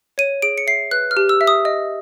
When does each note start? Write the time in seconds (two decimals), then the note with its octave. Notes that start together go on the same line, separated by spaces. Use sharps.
0.18 C#5 D#7
0.42 G#4 D7
0.58 C#7
0.67 E5 C7
0.91 B4 F#6
1.11 F6
1.17 G4
1.29 E6
1.41 E5
1.47 D#6
1.65 D#5